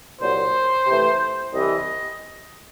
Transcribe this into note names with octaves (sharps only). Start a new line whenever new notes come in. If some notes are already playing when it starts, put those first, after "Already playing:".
C2 A#2 F#3 C5
C3 E3 A3
C2 C3 E3 D#5